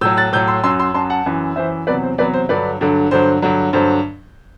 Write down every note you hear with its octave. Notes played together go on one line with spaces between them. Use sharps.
A2 F#3 E6 G6
F#6 A6
A2 F#3 E6 G6
C6 E6
F#2 F#3 C6 E6
C6 E6
F#2 F#3 A5 C6
F#5 A5
F#2 E3
F#2 E3 C5 E5
E2 C3 F#3 B4 D5
C5
E2 C3 F#3 B4 D5
C5
G2 D3 F#3 B4 D5
G2 D3 F#3
G2 D3 F#3 C5
G2 D3 F#3
G2 D3 F#3 C5